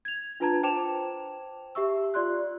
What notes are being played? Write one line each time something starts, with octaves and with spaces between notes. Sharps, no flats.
G#6 F7
D4 F4 B4 A5 A#5 G#6
C5 G5 A5 D6 E7 F7
G4 E5 C#6 E6
F4 D5 C6 F#6